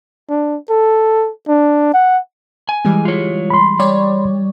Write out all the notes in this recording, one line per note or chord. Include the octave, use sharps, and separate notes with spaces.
D4
A4
D4
F#5
G#5
E3 G3 G#3
F4 C#5
B5 C6
G3 C#5 D5